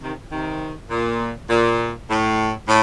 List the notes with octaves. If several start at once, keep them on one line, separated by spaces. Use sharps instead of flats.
C3 D#3
C3 D#3
A#2
A#2
A2
A2